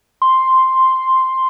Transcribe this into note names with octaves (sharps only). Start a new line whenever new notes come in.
C6